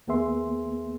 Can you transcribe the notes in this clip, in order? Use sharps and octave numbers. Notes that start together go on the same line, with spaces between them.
D#2 A#3 B3 G#4 E5 C6